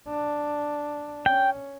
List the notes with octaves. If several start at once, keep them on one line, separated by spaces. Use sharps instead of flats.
D4
C#4 G5